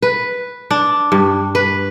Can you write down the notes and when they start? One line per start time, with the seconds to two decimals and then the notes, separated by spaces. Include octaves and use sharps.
0.02 B4
0.71 D4
1.12 G2
1.55 B4